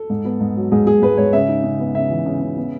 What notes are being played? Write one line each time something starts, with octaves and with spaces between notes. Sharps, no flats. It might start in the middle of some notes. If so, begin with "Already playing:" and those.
Already playing: A4
G#2
B3
G#2
F#3
G#2 G#4
G#2 G#4
G#2 B4
G#2 C#5
C#3 E5
D#4
C#3
B3
C#3 E5
E3
C#3
C#3
B3